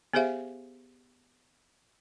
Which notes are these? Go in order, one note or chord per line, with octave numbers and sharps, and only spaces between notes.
B3 G4 G#4 C5 E5 F5